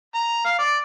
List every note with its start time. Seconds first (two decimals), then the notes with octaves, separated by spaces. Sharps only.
0.15 A#5
0.45 F5
0.59 D5